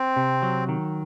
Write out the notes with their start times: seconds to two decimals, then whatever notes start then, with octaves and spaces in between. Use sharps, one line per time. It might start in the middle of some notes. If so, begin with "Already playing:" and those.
Already playing: C4
0.17 C3
0.43 F#3
0.69 D#3